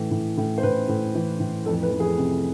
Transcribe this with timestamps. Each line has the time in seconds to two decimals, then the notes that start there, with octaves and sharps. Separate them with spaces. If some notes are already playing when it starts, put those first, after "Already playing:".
Already playing: A2 E3
0.11 A2
0.37 A2
0.58 C5
0.63 A2 B4
0.89 A2
1.15 E3
1.40 A2
1.65 F2 A4
1.83 B4
1.92 F2
2.00 G#4
2.18 C3